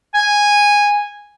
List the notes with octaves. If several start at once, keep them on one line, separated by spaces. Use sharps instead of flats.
G#5